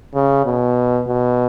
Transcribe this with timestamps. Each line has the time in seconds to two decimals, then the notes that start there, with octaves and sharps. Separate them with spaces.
0.15 C#3
0.46 B2
1.08 B2